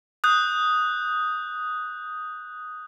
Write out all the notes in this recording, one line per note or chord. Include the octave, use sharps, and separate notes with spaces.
D#6 F#6 G6